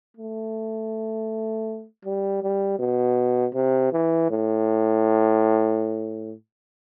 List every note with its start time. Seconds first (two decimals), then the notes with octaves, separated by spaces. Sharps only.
0.17 A3
2.05 G3
2.42 G3
2.79 B2
3.54 C3
3.92 E3
4.30 A2